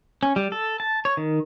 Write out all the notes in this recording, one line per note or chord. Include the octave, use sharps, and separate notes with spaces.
C#4
G3
A4
A5
C#5
D#3